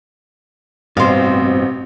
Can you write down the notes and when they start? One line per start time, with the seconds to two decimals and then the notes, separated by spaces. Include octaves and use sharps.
0.97 A1 G2 B2 C4 C5 F5